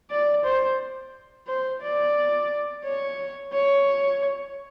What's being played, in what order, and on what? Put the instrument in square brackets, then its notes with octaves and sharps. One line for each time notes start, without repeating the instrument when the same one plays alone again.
[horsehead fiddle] D5
C5
C5
D5
C#5
C#5